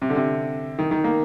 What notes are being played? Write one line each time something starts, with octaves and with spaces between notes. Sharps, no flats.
C3
D3
C3
D#3
D#3
A#3